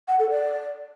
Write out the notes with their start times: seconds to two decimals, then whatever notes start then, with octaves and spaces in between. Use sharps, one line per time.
0.08 F#5
0.19 A4
0.30 D5